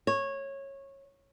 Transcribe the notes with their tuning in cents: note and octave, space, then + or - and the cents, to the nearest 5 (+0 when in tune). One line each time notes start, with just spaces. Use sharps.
C#5 -15